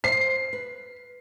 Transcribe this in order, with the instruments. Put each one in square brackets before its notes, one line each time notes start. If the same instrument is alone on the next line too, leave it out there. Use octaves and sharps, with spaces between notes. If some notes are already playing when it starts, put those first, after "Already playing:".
[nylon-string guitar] C5 [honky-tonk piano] C7
[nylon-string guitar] B4